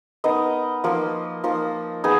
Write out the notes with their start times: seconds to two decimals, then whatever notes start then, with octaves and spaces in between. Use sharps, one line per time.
0.24 B3 D#4 A#4 D#5
0.84 F3 A#3 D#4
1.44 F3 A#3 D#4
2.04 B3 D#4 G#4